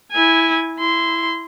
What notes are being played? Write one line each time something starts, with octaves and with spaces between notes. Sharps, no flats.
E4 G#5
E4 C6